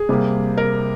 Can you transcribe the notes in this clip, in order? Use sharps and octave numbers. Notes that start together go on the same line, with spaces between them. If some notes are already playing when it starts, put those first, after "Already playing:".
Already playing: G#4
C3 G3 A#3
A#4